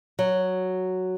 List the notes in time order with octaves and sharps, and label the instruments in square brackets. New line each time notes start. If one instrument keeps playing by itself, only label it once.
[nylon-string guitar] F#3